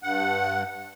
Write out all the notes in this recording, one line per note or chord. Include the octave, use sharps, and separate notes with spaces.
G2 F#5